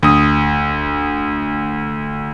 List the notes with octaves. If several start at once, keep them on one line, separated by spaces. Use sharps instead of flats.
D2 D#6